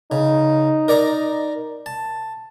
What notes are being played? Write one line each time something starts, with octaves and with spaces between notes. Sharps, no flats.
C#3 D#4
A#4 D5 A#5
A5